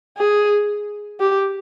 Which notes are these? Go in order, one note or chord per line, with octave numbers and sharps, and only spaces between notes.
G#4
G4